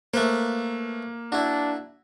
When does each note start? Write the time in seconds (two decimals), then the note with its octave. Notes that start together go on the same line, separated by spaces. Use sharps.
0.14 A3 A#3 B4 C5
1.32 D4 E4 F#4